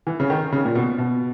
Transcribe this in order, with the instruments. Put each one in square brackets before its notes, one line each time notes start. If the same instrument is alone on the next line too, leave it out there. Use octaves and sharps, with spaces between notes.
[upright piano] E3
C#3
D#3
C#3
A#2
B2
B2